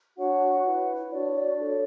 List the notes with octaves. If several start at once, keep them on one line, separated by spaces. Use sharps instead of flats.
D4 F#4 C#5 F#5
E4 B4
D4 F#4 C#5 D5
D5
D4 A4 C#5